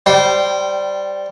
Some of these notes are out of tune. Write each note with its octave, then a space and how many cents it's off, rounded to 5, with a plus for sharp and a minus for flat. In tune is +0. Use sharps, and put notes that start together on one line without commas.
G3 -5 C5 +0 G5 -25